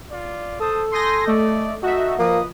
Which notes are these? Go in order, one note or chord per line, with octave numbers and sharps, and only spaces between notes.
F4 D5
A4 C5 A5 D#6
G#5 C6 D#6 G6 A#6
A3 D5 D#5
D#4 F#4 A4 D#5 E5
F3 A#3 B4 D#5 D#6